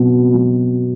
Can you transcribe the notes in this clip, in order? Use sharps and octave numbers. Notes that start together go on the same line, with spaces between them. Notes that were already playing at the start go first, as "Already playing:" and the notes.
Already playing: B2 F#3
F#3